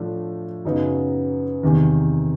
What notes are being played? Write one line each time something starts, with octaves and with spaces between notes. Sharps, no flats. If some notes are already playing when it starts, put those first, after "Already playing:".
Already playing: A2 F3 A3 D4
F#2 C#3 F#3 B3 D#4
E2 C3 D#3